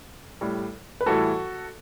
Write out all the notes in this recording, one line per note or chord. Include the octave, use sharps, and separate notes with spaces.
A2 G3
B4
A2 E3 G3 F#4 A4